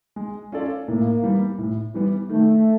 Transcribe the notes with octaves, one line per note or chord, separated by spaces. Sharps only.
G#3
C#4 F4 A4 D5
A2 A#3
E3 G3 B3
A2
E3 G3 B3
D#3 A3